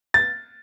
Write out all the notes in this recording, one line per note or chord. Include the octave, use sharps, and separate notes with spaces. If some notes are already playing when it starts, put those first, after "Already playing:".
A6